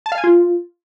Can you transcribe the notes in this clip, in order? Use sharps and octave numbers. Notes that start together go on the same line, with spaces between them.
A5
F5
G#5
F4